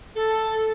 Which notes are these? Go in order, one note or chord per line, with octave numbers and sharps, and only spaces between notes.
A4